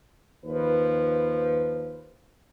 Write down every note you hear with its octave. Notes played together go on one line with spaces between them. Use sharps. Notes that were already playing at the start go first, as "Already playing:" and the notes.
D#2 F3 B4